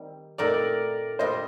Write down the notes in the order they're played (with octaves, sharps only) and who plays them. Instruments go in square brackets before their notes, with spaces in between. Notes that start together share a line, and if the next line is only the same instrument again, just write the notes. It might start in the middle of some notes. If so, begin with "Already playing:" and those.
Already playing: [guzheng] D#3 G3 C4
[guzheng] A#2 A3 C4 D#4 [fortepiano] A#4 D5
[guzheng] A#2 G3 D4 [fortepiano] C5 D#5